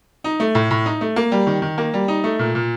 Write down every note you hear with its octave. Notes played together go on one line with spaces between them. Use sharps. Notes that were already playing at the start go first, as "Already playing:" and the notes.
D#4
A3
A2
A2
D#4
A3
A#3
G3
D#3
D#3
A#3
G3
D#4
A3
A#2
A#2